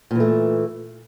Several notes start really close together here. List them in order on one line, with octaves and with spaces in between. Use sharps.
A#2 E3 A3